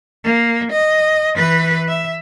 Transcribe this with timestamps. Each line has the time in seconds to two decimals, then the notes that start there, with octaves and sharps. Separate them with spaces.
0.24 A#3
0.72 D#5
1.34 E3 B4
1.88 E5